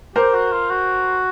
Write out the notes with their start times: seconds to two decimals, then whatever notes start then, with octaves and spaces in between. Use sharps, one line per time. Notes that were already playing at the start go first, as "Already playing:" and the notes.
0.16 G4 A#4 C5
0.34 F#4
0.52 F4
0.70 F#4